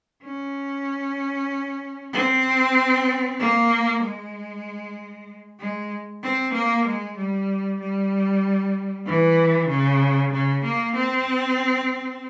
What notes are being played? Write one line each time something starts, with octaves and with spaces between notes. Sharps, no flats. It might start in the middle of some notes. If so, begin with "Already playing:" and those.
C#4
C4
A#3
G#3
G#3
C4
A#3
G#3
G3
G3
E3
C#3
C#3
A#3
C4